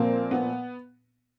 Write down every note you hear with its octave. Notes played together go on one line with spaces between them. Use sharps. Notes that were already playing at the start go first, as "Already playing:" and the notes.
Already playing: A#2 F3 A#3 C4
B3